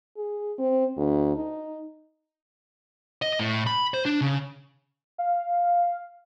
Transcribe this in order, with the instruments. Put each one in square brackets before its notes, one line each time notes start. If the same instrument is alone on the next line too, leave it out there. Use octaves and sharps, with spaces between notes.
[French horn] G#4
C4
D2
D#4
[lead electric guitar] D#5
A2
B5
C5
D4
C#3
[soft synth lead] F5